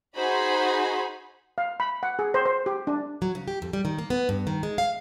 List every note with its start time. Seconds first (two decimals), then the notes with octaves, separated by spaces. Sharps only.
0.15 D#4 F#4 G#4 C5 B5
1.58 F5
1.80 B5
2.03 F#5
2.19 G#4
2.34 C5
2.45 C5
2.66 G4
2.87 D4
3.22 F#3
3.35 C#3
3.48 G4
3.62 F2
3.73 G3
3.85 D#3
3.99 A#3
4.10 B3
4.29 G2
4.47 D#3
4.63 G#3
4.78 F5